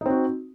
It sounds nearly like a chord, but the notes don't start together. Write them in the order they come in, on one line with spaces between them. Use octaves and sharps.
D#4 C4 F#4